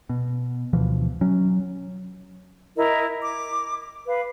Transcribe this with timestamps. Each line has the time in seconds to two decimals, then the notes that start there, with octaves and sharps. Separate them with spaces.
0.09 B2
0.73 D2 B2 E3 F3
1.21 F#3 C#4
2.76 E4 A#4 D#5
3.21 D6
4.06 B4 F5